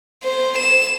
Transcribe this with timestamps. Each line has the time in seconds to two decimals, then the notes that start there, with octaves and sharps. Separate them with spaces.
0.24 C5
0.58 E7